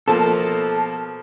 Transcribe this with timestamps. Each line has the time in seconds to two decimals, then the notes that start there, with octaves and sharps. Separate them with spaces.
0.08 B2 F3 A#3 A4